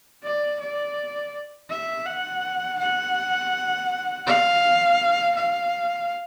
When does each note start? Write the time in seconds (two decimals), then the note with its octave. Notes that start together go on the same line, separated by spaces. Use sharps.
0.23 D5
0.60 D5
1.70 E5
2.06 F#5
2.79 F#5
4.26 F5
5.35 F5